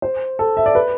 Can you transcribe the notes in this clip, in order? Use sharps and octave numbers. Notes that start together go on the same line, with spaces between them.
C5
A4
E5
D5
B4